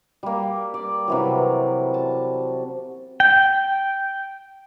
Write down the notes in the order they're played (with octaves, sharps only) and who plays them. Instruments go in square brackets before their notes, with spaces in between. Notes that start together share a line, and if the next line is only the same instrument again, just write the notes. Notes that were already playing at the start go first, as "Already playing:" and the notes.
[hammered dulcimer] G3 A#3
D5
C3 E3 F#3
A5
[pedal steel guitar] G5